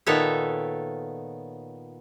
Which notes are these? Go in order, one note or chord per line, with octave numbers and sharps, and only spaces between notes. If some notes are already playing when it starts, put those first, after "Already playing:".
A#2 D#3 B3 A4 C#5 E5